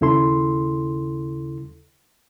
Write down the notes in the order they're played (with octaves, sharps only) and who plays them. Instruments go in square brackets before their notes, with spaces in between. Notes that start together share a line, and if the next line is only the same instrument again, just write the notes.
[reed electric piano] D#2 C#3 E4 A4 C6